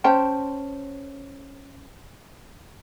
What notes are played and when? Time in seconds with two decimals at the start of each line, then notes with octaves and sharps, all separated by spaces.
0.04 C#4 C5 G5 A5